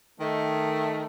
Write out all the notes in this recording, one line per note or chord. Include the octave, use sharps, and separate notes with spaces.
D#3 A3